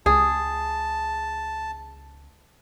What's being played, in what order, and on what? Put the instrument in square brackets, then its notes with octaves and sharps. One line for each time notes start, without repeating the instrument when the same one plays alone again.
[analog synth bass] C#2 [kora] G#4 [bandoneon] A5